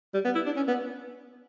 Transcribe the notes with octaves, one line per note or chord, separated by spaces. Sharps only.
G3
B3
E4
D4
C#4
B3